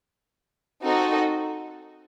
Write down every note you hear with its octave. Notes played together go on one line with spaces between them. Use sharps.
C4 D#4 F#4 A4 D#5